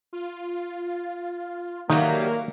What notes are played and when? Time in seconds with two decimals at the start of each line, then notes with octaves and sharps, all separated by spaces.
0.13 F4
1.90 D#3 F#3 G3 A3 A#3